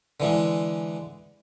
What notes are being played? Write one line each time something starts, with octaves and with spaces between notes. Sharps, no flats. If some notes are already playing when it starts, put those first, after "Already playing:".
D3 E3 G#3